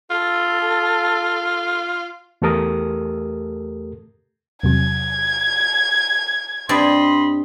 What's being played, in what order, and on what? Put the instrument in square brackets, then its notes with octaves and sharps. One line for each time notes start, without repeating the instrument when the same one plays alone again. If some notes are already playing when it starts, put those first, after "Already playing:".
[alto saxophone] F4 [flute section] A4
[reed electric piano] E2 A3 G4 A4 A#4 D#6
[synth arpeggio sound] E2 C3 F#3 [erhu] G#6
[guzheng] G2 C4 D5 [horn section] D#5 B5 C6